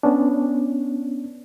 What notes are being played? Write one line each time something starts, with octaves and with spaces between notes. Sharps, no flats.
B3 C#4 D4